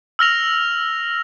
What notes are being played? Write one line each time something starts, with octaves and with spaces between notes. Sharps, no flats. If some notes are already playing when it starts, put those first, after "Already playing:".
E6 F6 A#6 F7